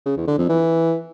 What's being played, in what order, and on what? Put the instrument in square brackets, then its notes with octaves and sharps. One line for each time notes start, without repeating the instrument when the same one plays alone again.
[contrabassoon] C#3
E2
D3
F2
E3